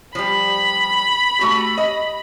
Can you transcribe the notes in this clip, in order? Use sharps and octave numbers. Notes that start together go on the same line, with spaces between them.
F3 G3 B5
A3 F#4 G4
D#5